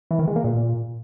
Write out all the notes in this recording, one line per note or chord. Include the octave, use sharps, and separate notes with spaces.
E3
D#3
G#3
A#3
A#2